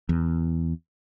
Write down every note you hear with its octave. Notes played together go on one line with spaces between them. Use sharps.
E2